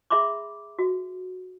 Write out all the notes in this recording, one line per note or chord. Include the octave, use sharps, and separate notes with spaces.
G#4 E5 B5 C6 D6
F#4